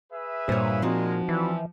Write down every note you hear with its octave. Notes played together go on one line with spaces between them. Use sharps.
G#4 B4 E5
G2 A#2 C5 C#5
F3 G#3 C4 D#4 F#4 A#4
E3 G3 F4 E5